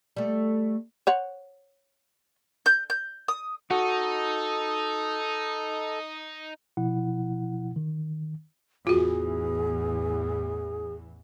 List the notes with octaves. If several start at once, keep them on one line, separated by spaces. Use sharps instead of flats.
G3 A3
C5 C#5 F#5
G6
G6
D#6
D#4 F#4 A4 D#6
B2 F3 E4 F#5
D#3
A1 E2 E3 F4 F#4 G#4